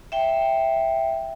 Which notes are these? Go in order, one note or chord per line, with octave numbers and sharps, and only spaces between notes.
E5 G5